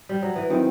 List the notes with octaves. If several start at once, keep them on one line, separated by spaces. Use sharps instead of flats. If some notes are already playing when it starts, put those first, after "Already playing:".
Already playing: A3
G3
F#3
E3
D#3 F#3 C4 E4